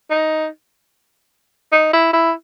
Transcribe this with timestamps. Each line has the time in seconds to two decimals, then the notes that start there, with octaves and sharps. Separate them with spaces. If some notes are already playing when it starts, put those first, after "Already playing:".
0.11 D#4
1.72 D#4
1.93 E4
2.13 E4